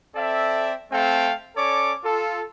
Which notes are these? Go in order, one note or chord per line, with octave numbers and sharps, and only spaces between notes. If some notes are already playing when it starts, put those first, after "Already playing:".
C4 A4 D5 E5
A3 C4 A4 F5 G5
C#4 A4 C#5 D5 D6
F4 A4